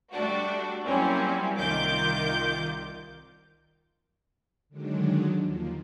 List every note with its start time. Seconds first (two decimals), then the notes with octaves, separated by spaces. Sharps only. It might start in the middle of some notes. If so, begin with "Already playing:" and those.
0.12 G3 A3 D4 F#4
0.84 F#3 G3 A#3 C4 C#4 E4
1.56 C2 D#3 F4 D6 G6
4.69 D3 D#3 F#3 G#3 D4
5.39 D#2 F3 A#3